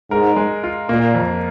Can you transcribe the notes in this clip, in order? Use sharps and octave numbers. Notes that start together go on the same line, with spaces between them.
G#2 A#4
G#3
F4
A#2 A#3
F2